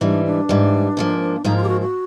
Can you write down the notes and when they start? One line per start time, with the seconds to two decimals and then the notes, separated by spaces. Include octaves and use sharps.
0.01 G#2 E3 G3 D4
0.25 D4
0.49 G#2 E3 G3
0.97 G#2 F3 A#3
1.44 G#2 F3 A#3 D#4
1.57 F4
1.63 G4
1.69 F#4
1.81 F#4